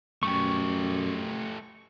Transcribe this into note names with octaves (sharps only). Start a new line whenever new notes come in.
F#2 A3 G4 C#6